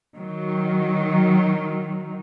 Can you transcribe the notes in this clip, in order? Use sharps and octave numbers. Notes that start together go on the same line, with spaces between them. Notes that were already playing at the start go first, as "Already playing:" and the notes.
D#3 F#3